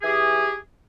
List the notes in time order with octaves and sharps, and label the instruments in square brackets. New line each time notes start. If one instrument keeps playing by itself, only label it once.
[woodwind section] E3 G4 G#4